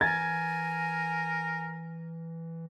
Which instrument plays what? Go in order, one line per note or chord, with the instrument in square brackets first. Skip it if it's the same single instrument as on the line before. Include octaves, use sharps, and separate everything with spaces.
[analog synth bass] E3 [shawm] A#4 [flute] G#5 [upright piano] G#6 A6